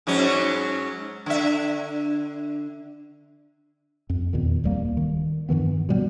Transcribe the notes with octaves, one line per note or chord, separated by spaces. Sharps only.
G#2 F#3 C#4
D3 E5
F2
E2 A#2 D#3
D1 G3 A#3
D#3
G2 D#3 E3 B3
B2 G3 B3